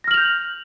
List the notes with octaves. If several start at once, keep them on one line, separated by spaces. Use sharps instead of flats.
F6 G6 A#6 F7 F#7